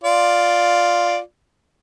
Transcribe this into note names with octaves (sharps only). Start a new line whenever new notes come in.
F4 D5